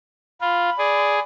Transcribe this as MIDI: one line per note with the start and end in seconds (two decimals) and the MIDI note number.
0.41 0.70 65
0.41 1.21 83
0.79 1.20 68
0.79 1.22 74